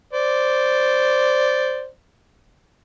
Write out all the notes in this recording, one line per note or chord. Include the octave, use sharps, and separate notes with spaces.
C5 D5